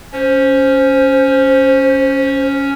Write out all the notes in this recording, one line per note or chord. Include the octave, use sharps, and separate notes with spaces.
C#4 C5